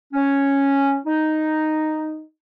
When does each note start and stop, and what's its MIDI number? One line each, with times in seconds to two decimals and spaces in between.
0.13 0.97 61
1.06 2.22 63